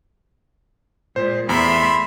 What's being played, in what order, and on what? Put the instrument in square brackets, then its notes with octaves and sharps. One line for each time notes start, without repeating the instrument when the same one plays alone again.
[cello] A#2 G#3 [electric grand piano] C5
[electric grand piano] E2 [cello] A3 E5 [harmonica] B5 C6